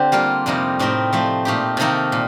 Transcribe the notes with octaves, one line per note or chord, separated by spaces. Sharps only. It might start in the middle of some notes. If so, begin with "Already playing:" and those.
Already playing: D3 C4 D4 G4 C5
G3 A#3 F4
F2 C3 G3 A#3 D#4
A2 G3 C4 D#4 A#4
F3 A3 C4
A#2 A3 D#4 G4
C3 D#3 A#3 D#4 A4
A#2